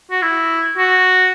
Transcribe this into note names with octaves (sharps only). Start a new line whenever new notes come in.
F#4
E4
F#4